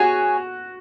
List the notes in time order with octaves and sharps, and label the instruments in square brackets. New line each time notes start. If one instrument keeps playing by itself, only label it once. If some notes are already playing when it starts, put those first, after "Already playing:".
Already playing: [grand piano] F#4 [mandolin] G#4 C#5 G#5